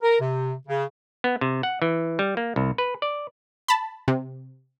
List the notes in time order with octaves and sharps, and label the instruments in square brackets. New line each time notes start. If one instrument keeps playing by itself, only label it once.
[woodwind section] A#4
C3
C#3
[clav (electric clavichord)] B3
C3
F#5
E3
G3
A#3
C2
B4
D5
[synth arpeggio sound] A5 B5
C3